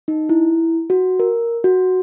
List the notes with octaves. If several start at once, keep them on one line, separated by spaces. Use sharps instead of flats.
D#4
E4
F#4
A#4
F#4